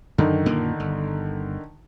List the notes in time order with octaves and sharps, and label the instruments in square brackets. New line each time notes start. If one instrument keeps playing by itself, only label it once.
[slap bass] F#2 [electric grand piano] D3 D#3 D#4
[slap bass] F#2 A#2 A#3
G1